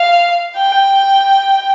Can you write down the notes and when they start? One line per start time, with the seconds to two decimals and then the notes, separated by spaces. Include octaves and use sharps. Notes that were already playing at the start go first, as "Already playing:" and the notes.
Already playing: F5
0.56 G5